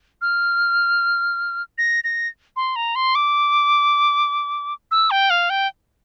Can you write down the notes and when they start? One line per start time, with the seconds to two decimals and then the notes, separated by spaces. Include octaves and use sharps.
0.21 F6
1.78 A#6
2.04 A#6
2.56 C6
2.76 A#5
2.95 C6
3.15 D6
4.91 E6
5.11 G5
5.30 F5
5.50 G5